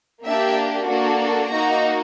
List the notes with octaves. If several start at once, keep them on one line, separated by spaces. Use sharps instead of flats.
A#3 D4 G4 E5
A#3 D4 F#4 A4
A#3 D#4 F#4 A#5